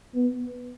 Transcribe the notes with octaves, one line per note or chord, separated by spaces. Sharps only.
B3